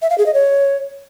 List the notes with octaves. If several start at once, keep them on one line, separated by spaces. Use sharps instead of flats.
E5
F5
G#4
D#5
C#5